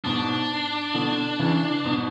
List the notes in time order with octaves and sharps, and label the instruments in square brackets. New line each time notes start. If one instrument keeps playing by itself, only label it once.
[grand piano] G#2 B2 [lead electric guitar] D4
[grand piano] B2 D3
C#3 E3
G#2 B2